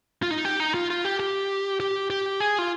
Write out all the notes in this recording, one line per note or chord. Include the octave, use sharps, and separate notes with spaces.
F4
D#4
G4
D#4
F4
F4
G4
G4
G4
G4
G#4
F4